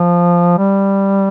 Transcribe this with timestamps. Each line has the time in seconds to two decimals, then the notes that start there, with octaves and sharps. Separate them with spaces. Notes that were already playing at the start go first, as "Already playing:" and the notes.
Already playing: F3
0.58 G3